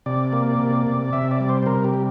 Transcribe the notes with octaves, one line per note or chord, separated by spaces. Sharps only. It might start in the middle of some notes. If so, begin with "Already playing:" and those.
C3 D5
A#3
C3
C3
C3 E5
D5
G3
C5
C5
C3 A#4
G4
G3